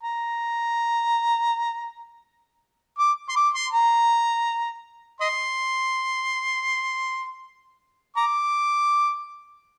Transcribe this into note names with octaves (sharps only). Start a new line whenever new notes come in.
A#5
D6
C6
D6
C6
A#5
D#5 C6
A#5 D6